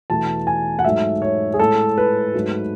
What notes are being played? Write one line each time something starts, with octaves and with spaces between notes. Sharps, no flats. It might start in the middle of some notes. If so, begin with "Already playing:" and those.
E2 B2 A3 A5
G#5
F#5
G#2 F#3 A3 E5
C#5
G#4
A2 G#3 A4
B4
G#2 F#3 A3